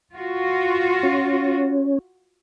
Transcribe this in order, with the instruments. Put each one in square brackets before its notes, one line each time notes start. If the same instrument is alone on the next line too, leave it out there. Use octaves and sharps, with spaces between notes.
[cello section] F4 F#4
[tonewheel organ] C#4